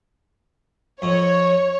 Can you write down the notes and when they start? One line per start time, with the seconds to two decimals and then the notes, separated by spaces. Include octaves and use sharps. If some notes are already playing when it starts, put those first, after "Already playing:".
1.02 F2 C#5